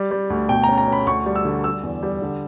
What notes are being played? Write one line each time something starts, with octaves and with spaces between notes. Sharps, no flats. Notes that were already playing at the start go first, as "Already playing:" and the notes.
Already playing: G3
G3
D2
B2 G5
C#4 A#5
A#5
C#4 B5
D2 C#6
G3
E6
D3
G3 E6
E2
G3
D3